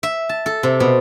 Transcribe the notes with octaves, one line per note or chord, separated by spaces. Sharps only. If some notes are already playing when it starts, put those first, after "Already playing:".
E5
A5
A4
C3
B2